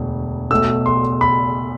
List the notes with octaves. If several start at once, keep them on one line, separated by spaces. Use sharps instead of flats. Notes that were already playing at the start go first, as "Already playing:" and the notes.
Already playing: E1 D2
B1 B2 A3 E6
C6
B5